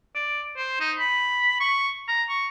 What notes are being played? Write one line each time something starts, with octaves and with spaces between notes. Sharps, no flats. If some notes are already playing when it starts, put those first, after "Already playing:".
D5
C5
D#4
B5
C#6
A#5
C#6